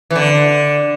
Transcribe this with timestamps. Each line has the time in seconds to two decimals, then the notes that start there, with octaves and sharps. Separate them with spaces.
0.11 E3
0.16 D3